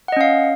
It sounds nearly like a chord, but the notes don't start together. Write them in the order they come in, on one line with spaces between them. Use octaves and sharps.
F#5 D#5 C#4 F5